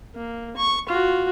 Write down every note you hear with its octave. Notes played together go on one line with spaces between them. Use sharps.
A#3
C#6
F4 F#4